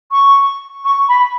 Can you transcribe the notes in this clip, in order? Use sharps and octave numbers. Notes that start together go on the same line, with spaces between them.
C#6
C#6
B5